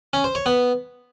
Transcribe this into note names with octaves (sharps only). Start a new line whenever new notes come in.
C#4
C5
C#5
B3